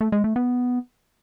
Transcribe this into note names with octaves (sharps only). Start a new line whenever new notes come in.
A3
G#3
A3
B3